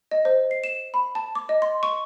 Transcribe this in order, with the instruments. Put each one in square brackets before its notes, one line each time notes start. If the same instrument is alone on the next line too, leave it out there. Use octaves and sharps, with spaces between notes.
[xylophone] D#5
C5
C7
E7
B5
A5
D6
D#5
C6
C#6